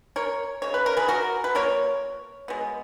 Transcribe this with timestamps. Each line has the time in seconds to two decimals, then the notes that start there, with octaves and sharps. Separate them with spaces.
0.16 A#4 C#5
0.62 C#3 G#3 C#5
0.74 B4
0.86 A#4
0.97 G#4 B4
1.08 F#4 A#4
1.44 B4
1.55 F3 A#3 A#4 C#5
2.48 B2 G#3 B3